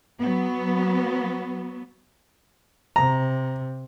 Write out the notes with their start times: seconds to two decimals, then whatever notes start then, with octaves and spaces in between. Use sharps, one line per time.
0.19 F#3 B3
2.96 C3 A#5